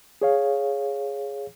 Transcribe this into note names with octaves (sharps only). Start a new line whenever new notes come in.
G#4 C#5 F5